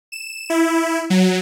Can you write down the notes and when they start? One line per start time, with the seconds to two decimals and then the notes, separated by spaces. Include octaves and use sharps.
0.12 E7
0.50 E4
1.10 F#3